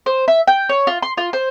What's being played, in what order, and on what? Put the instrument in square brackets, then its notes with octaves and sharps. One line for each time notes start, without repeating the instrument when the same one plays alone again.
[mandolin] C5
E5
G5
C#5
F4
C6
F4
C5